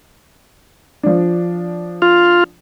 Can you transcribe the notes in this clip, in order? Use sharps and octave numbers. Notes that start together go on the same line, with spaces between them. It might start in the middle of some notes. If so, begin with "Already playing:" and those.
F3 D4
F4